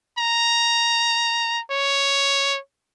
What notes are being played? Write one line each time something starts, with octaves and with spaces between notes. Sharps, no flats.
A#5
C#5